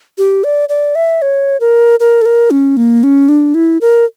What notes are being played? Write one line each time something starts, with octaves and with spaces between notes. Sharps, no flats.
G4
D5
D5
E5
C#5
A#4
A#4
A4
A#4
C#4
A#3
C#4
D4
E4
A#4